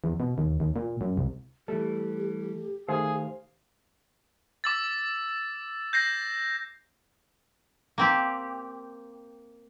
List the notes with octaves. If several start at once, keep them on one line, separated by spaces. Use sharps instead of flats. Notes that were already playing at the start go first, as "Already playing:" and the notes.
E2
B2
D#2
D#2
A#2
F#2
C2
E3 G3 A3 G4 A4
D#3 A3 G#4 C5 F5
D6 E6 A6
G6 A#6 C7
A#3 C4 G4